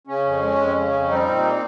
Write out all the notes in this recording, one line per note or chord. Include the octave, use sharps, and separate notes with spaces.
C#3 C#4
F2
G#3
F2
C#3
F2
G3 C4 D#4
A#2
A#3